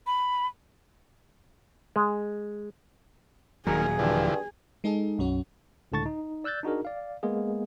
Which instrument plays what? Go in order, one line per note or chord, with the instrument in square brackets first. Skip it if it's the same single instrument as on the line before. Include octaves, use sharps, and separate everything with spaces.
[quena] B5
[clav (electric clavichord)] G#3
[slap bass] D#1 A#2 F#3 [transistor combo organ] D#3 A#3 [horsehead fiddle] G#4
[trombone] G2 [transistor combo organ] D3 E3 F3
[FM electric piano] G#3 D#4 G#4 A4
B1 F#2 C#4 F#4
[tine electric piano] C#2 A2 D3 A5 C#6 A6
D#4
D5 E6 F#6 G6 A6
D4 D#4 F#4 G#4 A#4
D5 F5
G#3 A#3 B3 G#4